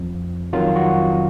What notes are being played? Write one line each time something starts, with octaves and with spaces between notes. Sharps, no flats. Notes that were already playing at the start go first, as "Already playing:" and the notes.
Already playing: F2 F3
F2 D#3 F#3 F4
F#4